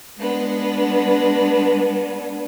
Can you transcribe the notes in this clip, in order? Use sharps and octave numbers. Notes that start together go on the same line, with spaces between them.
G#3 B3 D4